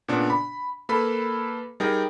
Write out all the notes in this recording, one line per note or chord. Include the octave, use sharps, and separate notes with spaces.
A#2 C#3 B3 D4
B5
A#3 A4 B4 B5
G3 D#4 G#4 A#4 G5